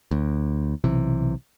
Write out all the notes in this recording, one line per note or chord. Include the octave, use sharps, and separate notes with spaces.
D2
B1 C3 E3